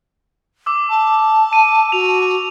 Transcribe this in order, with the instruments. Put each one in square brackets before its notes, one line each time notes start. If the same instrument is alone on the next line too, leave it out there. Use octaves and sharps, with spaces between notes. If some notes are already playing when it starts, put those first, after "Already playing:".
[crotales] D6 E6
[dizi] A5
[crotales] D#7
[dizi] F#4 [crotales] F7